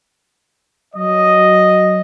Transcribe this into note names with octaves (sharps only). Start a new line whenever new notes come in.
F#3 D#5